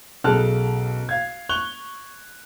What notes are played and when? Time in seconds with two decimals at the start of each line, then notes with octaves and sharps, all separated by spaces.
0.24 B1 C#3 A4 A5 F6 F#6
1.09 F5 G#6
1.49 C#6 F#6 F7 G7